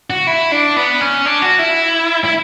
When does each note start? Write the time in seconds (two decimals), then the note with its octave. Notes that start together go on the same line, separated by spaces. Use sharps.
0.10 F#4
0.27 E4
0.52 D4
0.77 B3
1.01 C#4
1.26 D4
1.42 F#4
1.59 E4
2.24 E4